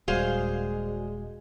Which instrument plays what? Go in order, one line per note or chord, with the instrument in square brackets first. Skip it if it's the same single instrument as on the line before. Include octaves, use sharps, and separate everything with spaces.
[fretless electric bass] D#1 [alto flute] G#3 [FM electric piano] F#4 D5 [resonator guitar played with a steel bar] G#4 C5 F5